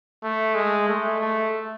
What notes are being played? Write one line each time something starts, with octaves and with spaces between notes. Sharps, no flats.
A3
G#3
A3
A3